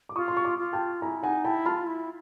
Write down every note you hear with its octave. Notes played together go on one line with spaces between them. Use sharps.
D6
F4 C#6 D#6
C6
C#6
C6 D6
F4
G5 A5
E4 G#5 A#5
D#4 F#5 G#5
E4 G5 A5
F4 A5 B5
E4